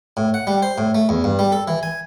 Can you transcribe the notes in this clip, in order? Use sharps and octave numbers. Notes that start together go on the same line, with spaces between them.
A2
F#5
G3
C5
A2
A3
E2
G2
G3
A4
E3
G#5